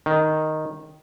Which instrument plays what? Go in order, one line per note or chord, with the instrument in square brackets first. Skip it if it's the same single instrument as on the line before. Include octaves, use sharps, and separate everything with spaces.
[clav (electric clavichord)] D#3